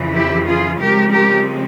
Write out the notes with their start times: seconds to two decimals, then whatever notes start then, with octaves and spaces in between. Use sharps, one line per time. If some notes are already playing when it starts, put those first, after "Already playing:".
Already playing: F2 C#3 E3
0.15 E4 G4
0.48 F4 G#4
0.80 C#3 F3 G#3 C4 G4 A#4
1.13 G4 A#4